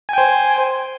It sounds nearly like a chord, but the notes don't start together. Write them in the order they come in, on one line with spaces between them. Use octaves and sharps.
G#5 G5 C5